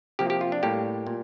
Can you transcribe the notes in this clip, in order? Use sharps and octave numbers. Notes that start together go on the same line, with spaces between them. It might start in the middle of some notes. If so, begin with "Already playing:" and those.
C3 F3 A#3 G4
G4
F4
D4
A2 G3 A#3 G4
A#2